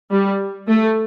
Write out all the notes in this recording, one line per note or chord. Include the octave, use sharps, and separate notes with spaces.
G3
A3